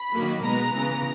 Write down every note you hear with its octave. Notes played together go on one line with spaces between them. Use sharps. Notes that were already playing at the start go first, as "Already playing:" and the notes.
Already playing: B5
D#3 F#3 A#3
B2 G#3 B3 A#5
C#3 E3 B3